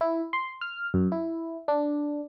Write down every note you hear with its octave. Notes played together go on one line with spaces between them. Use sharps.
E4
C6
F6
F#2
E4
D4